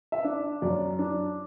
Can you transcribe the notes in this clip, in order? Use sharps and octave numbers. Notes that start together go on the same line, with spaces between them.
E5
D4
F#2 D5
D4